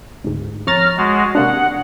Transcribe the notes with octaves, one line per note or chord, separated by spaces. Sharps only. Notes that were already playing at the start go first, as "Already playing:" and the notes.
D2 G#2
F2 C#5 A#5 F6 A6
G#3 F#4
C3 A#3 D4 F#5